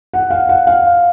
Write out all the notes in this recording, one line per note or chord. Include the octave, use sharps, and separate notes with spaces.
F#5
F5
F#5
F5